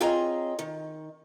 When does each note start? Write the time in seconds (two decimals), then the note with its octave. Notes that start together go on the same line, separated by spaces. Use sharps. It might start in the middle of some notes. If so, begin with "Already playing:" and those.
0.01 C4 F4 G#4 C#5 D#5 A#5
0.59 D#3